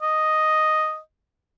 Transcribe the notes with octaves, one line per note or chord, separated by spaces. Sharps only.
D#5